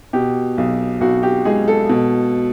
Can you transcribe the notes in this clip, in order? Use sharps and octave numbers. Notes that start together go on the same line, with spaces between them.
B2 G4
B1
B1 F#4
G4
G#3 G#4
A4
B2